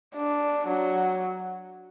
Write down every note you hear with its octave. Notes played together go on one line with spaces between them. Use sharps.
D4
F#3